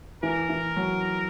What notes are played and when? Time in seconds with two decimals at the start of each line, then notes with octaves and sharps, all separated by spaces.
0.23 E3 A#4
0.49 E3
0.76 F#3